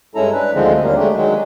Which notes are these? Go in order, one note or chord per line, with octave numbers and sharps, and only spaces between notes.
G2 G#3 C#4 E4 A4 A#5
D4 B4
D2 D3 D#3 F3 G#3 C4
D#2 G3 A#3
G#3 A3 D4 G4
D#3 F#3 G#3